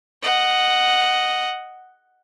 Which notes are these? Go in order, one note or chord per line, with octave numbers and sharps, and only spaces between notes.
D#5 F#5